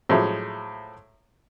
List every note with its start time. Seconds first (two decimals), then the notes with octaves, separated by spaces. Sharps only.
0.09 A2 F3 F#3 G#3 E5